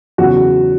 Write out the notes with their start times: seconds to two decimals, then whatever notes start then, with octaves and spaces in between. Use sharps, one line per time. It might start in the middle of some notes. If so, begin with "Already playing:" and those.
0.18 E2 C#3 F#3 F#4